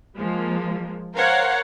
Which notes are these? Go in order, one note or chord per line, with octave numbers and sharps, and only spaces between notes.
F3 G#3 A#3
A#4 C5 C#5 F5 F#5